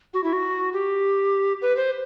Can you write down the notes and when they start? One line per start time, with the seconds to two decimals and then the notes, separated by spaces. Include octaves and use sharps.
0.14 F#4
0.24 E4
0.33 F#4
0.73 G4
1.62 B4
1.77 C5